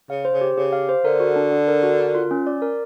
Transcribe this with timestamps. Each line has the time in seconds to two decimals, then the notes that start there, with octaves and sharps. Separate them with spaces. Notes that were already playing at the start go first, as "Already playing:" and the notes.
0.10 C#3 F5
0.25 C5
0.33 C#3
0.41 G4
0.57 C#3 G4
0.73 F5
0.89 C5
1.05 D3 A#4
1.20 F#4
1.36 D4
1.52 D4
1.68 A#4
1.83 F#4
1.99 A#4
2.15 F4
2.31 C#4
2.47 D5
2.62 A#4